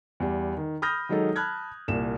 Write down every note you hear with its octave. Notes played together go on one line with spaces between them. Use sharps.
E2 G3
D#3
B5 D#6 F6 G6 A#6
D#3 F#3 G#3 D#4 A4
A5 B5 F6 F#6 G#6
C2 A#2 E7